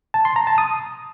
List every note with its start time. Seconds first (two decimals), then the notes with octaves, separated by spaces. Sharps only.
0.14 A5
0.25 C6
0.36 A#5
0.47 A5
0.58 D#6